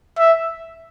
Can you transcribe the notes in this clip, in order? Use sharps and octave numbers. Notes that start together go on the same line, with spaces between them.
E5